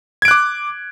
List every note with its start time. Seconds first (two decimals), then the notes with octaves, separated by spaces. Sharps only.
0.22 G#6
0.25 D7
0.28 F#6
0.31 D6